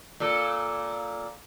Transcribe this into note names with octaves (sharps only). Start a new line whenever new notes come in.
A#2 A4